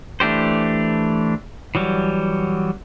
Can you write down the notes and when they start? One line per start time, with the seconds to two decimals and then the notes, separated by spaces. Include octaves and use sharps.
0.20 E3 A3 D4 G4 C5
1.75 E3 F#3 G3